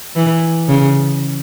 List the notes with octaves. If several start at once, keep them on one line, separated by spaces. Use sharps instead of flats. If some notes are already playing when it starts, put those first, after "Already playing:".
E3
C#3